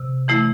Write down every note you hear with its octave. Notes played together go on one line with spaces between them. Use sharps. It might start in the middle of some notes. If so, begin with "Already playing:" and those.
Already playing: C3
E3 A3 E4